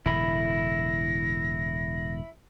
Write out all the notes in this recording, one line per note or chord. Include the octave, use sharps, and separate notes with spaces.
E1 A2 D3 E4 B5 A#6